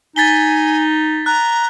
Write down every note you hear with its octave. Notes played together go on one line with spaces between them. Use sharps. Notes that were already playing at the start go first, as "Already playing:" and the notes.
D#4 G#5 A6 B6 G7
A#5 F#6